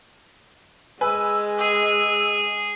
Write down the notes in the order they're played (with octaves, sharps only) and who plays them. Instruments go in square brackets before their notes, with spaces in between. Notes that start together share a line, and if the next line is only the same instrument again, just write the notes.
[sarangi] G#3 [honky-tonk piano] B4 G#5 [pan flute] E6
[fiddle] G#4 [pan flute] E6